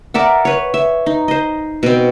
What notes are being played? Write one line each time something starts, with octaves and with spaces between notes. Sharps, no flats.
A#4 D5 E5 F#5
B4 C#5
E5
D#4
C5 D#5
B2 C4